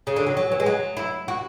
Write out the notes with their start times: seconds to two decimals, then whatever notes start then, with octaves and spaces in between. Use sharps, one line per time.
0.07 C#3
0.16 D3
0.27 F#3
0.37 F#3
0.52 E3
0.60 G#3
0.66 F#3
0.97 E4
1.28 F#4